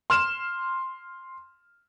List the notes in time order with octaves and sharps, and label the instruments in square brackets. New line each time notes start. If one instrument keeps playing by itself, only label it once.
[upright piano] C6 F6 E7